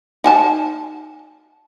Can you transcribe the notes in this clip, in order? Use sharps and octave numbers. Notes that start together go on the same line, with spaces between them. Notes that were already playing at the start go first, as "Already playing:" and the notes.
D#4 G#5 A5